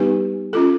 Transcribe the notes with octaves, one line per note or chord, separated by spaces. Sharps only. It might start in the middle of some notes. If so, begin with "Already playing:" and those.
Already playing: G3 B3 D#4 G4 B4
C#4 F4 A4